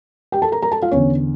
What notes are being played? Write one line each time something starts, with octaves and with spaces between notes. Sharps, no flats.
G4 G5
A4 A5
A#4 A#5
A#4 A#5
A4 A5
F4 F5
E2 D3 C#4 C#5